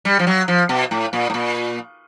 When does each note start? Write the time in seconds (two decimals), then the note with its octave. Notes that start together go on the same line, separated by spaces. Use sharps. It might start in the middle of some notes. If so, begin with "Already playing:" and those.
0.05 G3
0.19 F3
0.27 F#3
0.48 F3
0.69 B2
0.91 A2
1.13 A#2
1.30 A2
1.34 A#2